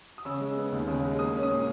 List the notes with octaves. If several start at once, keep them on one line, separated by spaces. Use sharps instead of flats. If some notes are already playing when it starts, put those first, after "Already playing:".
D#6
C#3 E6
G#3
B3
D#2
C#3
G#3
A#3 D#6
C#4
D#6
A#2